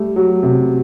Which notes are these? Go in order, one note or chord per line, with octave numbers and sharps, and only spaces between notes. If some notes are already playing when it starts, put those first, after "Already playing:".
Already playing: G3 A3
F#3
C3